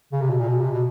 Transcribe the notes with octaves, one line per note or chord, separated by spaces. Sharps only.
C#3
C3
B2
A#2
B2
C3
B2